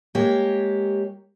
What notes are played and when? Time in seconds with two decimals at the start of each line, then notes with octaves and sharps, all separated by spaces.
0.15 G#3 A#3 G4 C#5